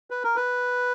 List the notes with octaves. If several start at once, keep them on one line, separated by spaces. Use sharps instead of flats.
B4
A#4
B4